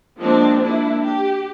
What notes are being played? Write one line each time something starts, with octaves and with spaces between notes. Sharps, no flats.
F3 G#3 A#3 C4 D4
A#3 D4 E4
G4